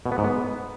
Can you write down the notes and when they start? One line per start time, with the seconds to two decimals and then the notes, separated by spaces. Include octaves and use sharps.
0.06 B2
0.12 B3
0.18 G#2
0.24 B3